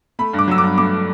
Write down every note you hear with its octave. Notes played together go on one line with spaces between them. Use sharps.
A3 B5
G2
D6
F#3 E6
D6
G2
A3 D6